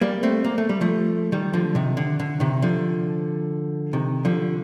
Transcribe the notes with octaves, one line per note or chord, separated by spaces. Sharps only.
G3 A#3
A3 C4
A#3
A3
G3
F3 A3
D#3 G3
D3 F3
C3 D#3
D3
D3
C3 D#3
D3 F3
C3 D#3
D3 F3